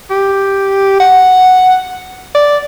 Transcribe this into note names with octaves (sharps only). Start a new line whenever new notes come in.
G4
F#5
D5